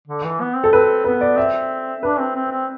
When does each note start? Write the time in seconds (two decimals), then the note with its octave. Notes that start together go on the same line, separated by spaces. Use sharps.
0.07 D3
0.24 E3
0.41 B3
0.56 C4
0.64 A4
0.73 C4 B4
1.04 B3 B4
1.21 D5
1.37 C4 E5
2.02 D4 B4
2.19 C4
2.35 C4
2.51 C4